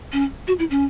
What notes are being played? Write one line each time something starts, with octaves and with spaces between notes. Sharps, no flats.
C#4
F#4
E4
C#4